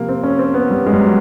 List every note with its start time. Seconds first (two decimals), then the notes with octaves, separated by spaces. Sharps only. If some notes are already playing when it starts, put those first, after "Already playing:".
Already playing: C3 F3 A#3
0.09 C4
0.23 C#4
0.39 C4
0.54 B3
0.70 G3
0.87 G#3
0.93 G3
1.01 F#3